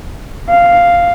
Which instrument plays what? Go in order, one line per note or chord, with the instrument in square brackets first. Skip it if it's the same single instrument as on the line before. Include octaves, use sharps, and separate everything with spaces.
[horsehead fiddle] F5